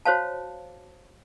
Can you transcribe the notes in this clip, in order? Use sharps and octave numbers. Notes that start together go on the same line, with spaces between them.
F#4 C5 C#5 F5 A5